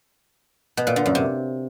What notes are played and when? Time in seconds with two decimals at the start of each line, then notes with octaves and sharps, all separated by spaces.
0.77 B2
0.87 A#2
0.96 D3
1.06 F#2
1.15 C3